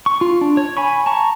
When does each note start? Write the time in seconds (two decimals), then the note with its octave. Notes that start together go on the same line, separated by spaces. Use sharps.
0.06 C#6
0.21 F4
0.41 D4
0.57 C#5
0.77 G#5 B5 C#6
1.06 A5 A#5 C#6